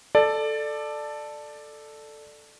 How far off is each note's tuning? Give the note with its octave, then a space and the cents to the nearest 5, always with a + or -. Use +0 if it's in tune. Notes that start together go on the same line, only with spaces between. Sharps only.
A4 +0 D5 +15 A5 +0